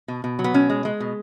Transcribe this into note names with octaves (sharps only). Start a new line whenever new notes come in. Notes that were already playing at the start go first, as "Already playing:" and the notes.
B2
B2
F#3
B3
B2 C#4
G#3
G#3
B2